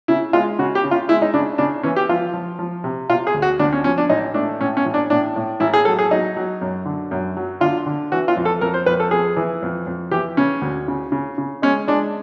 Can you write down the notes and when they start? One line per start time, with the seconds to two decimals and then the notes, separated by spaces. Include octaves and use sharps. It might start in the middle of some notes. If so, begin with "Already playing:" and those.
0.08 C#3 E4
0.33 G#3 F4
0.59 C#3 F#4
0.75 G4
0.84 C#3
0.91 F4
1.09 G#3 E4
1.22 D#4
1.34 C#3 D4
1.58 C#3 D4
1.83 E3 C#4
1.96 G4
2.09 F3 F4
2.34 F3
2.59 F3
2.84 C3
3.09 C3 F4
3.27 G#4
3.34 D2
3.42 F#4
3.59 D2 D4
3.73 C#4
3.84 F3 C#4
3.98 D4
4.09 A1 D#4
4.34 A3 D4
4.60 A2 C#4
4.77 C#4
4.86 A1
4.94 D4
5.10 A2 D4
5.36 A2
5.60 A1 E4
5.74 G#4
5.85 F#3 A4
5.99 G#4
6.11 F#3 D#4
6.36 F#3
6.61 F#2
6.86 D3
7.11 F#2
7.37 F#3
7.61 D3 F4
7.86 D3
8.12 E3 F#4
8.28 F4
8.37 F2
8.45 A4
8.61 F2 A#4
8.74 C5
8.86 F2 B4
9.00 A4
9.11 F2 G#4
9.36 E3
9.62 F2
9.87 F2
10.11 E3 G4
10.37 C#3 C#4
10.62 D2
10.88 C#3
11.12 C#3
11.38 C#3
11.62 G#3 C#4
11.88 G#3 D4